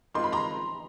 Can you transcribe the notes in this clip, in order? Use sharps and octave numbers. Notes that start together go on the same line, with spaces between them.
D#3 G#3 C4 F4 C6
B5
A#5 C6